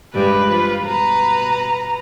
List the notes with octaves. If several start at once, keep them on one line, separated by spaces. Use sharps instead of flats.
G2 G3 G#3 B4
F3 F4
B2 B4 A#5